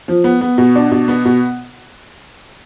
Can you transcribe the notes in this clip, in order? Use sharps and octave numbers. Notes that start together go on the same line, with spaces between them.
F3
B3
B3
B2
D4
B2
B3
B2